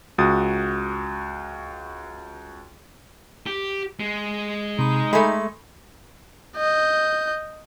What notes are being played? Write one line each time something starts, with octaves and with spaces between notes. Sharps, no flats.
C#2 F#4 D#6 A6
G4
G#3
C3 D#4 B5
G#3 A3 G#5 B5
D#5 G6